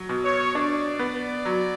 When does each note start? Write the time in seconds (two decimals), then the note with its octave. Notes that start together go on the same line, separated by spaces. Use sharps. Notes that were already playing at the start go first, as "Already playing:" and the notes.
Already playing: F#3
0.09 B2
0.24 C#5
0.55 D4 D5
0.99 B3
1.45 F#3